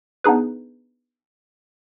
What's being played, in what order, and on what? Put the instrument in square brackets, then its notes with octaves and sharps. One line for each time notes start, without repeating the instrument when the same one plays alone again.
[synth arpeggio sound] B3 D4 D#4 G#4 B4